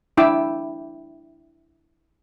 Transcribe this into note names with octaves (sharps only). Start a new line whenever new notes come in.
D4 E4 G5 D6 E6